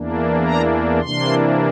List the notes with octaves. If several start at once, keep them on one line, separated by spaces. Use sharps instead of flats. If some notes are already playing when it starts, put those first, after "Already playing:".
Already playing: E2 E3 A#3 D4
A#5
C3 E3 A#3 D4 C6